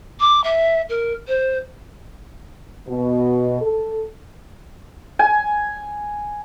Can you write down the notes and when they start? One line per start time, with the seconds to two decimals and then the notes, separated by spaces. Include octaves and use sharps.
0.20 D6
0.44 E5
0.90 A#4
1.28 C5
2.88 B2
3.62 A4
5.19 G#5